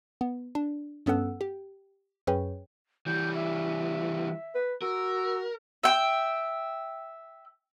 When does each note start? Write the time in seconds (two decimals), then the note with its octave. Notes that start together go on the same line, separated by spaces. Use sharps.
0.21 B3
0.55 D4
1.06 G2 B3 C#4 A4 F#5 E6
1.41 G4
2.27 F#2 C#4 G#4 B4 C#5 G5
3.07 E3 G3 G6
3.34 E5
4.55 B4
4.82 F#4 A#4 E6
5.84 E5 G5